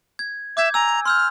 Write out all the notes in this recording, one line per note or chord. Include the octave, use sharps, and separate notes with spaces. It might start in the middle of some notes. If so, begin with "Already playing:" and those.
G#6
E5 D6 G6 G#6
G#5 A#5 E6
C6 E6 F6 G6